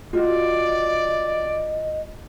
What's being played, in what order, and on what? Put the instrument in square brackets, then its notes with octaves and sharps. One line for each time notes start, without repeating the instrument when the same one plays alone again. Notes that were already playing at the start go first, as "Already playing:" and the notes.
[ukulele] F4 F#4 [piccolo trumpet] D5 [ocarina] D#5